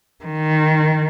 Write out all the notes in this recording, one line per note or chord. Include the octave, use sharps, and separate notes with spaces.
D#3